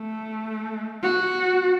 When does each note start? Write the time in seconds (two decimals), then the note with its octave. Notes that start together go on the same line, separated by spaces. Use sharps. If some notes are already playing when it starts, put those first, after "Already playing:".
Already playing: A3
1.03 F#4